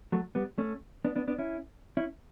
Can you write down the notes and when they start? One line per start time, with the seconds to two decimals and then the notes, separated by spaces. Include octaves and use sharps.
0.12 F#3 A3
0.35 G3 B3
0.58 A3 C#4
1.05 B3 D4
1.16 B3 D4
1.28 B3 D4
1.38 C#4 E4
1.97 C#4 E4